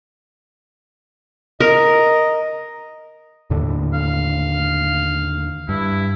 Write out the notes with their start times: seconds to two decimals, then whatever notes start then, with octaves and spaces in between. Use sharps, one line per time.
1.60 A#4 D#5
3.50 D#2 A2 D3
3.94 F5
5.69 G2 E4